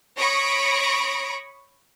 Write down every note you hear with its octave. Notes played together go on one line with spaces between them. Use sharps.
C#5 B5 C#6 D#6 A#6 D7